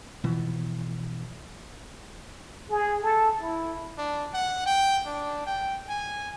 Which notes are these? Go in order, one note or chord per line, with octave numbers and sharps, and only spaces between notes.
B2 E3 F3
G#4
A4
E4
D4
F#5
G5
D4
G5
G#5